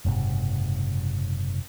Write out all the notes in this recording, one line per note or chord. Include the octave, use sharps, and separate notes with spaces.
F#1 G#2 C3